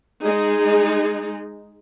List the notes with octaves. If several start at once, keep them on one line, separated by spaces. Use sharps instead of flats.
G#3 D#4 G#4